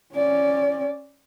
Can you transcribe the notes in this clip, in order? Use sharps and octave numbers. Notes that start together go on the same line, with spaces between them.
C#4 D5